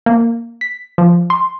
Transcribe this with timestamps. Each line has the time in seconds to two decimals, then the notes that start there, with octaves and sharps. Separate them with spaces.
0.06 A#3
0.61 B6
0.98 F3
1.30 C6